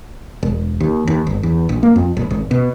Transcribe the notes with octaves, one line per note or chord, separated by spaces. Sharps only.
E1
D#2
D#2
G1
E2
A#1
A#3
F2
D#1
G#1
B2